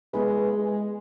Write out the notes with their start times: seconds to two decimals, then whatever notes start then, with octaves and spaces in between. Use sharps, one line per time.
0.13 G#3 B3 E4 G#4 B4
0.53 G#3